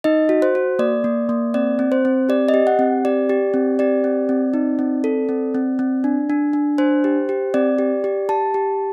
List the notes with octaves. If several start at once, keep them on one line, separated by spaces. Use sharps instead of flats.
D#4 D#5
F#4
C5
F#4
A#3 D5
A#3
A#3
C4 D5
C4
C5
C4
G4 D5
D#5
G4
F#5
C4
G4 D5
G4
C4
G4 D5
C4
C4
D#4
C4
A4
C4
C4
C4
D4
D4
D4
D4 C5
G4
G4
C4 D5
G4
G4
G4 A5
G4